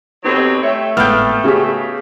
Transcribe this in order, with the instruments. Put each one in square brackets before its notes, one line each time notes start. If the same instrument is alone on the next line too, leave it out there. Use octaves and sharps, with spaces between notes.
[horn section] B2 F#3 C4 [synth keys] D#4 G4 A4
[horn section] A3 [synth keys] C#5 E5 G5
[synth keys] G#1 A2 A6 [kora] B3 F5 G5 [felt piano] F6 G6
[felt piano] C#3 C#4 G4 [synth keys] F#4